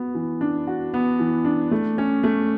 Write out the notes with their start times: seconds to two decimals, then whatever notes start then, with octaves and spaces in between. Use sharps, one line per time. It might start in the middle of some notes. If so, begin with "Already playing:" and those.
Already playing: B3 F#4
0.15 E3
0.41 D4
0.67 F#4
0.94 B3
1.19 E3
1.45 D4
1.71 A3
1.98 C#4
2.23 A3